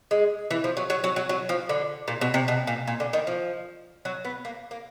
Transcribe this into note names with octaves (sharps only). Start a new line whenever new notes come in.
G#3
E3
F3
F#3
F#3
F#3
F#3
F#3
F3
D3
A#2
B2
C3
B2
A#2
A#2
D3
D#3
F3
F#3
B3
A#3
A#3